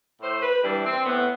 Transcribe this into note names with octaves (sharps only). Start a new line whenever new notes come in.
A2 C5
B4
E3 G3 D4
C4
A2 B3